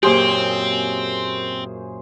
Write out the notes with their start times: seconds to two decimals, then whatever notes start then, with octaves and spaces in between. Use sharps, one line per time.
0.03 F#2 A#2 C4 G4 G#4 C5 C#5